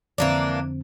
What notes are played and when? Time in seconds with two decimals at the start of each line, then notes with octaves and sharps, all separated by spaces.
0.18 F2 D3 E3 A#3 C4 D4